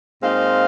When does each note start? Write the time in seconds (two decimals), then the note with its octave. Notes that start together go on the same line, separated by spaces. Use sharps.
0.22 A#2 G#3 C4 D#4 F5